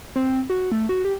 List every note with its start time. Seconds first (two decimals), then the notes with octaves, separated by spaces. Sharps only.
0.16 C4
0.50 F#4
0.72 A3
0.89 F#4
1.05 G4